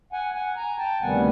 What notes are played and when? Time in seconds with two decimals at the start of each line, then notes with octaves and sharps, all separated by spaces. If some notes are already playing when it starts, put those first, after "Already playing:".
0.12 F#5 G#5
0.34 F#5 G#5
0.56 G#5 A#5
0.78 G5 A5
1.01 D2 C3 D#3 G3 B3 F#5 G#5